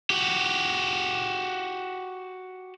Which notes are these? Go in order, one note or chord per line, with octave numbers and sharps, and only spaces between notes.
F#4 G4